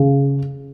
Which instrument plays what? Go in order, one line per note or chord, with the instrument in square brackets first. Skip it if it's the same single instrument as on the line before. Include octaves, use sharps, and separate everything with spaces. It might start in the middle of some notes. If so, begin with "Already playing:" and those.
Already playing: [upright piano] C#3